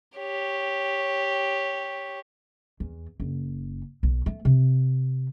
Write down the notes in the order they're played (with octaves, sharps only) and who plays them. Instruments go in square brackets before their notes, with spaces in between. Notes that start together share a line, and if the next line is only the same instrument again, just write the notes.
[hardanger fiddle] G4 C#5
[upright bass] E2
F#1
B1
A3
C3